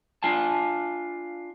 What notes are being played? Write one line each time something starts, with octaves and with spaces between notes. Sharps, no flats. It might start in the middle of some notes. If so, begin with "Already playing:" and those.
D4 F4 F5 G#5 A5